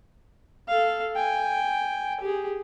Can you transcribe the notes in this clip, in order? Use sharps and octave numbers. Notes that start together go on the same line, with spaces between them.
A4 F5
G5 G#5
G4 G#4